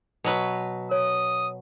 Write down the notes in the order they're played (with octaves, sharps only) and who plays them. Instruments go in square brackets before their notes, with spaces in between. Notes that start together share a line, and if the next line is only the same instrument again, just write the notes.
[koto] B2 F#3 B4
[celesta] C#5 [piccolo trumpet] D#6